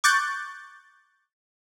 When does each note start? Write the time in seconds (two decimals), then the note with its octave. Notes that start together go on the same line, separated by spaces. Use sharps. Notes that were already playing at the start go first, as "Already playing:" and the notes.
0.04 C#6 D6 F#6 G6 A6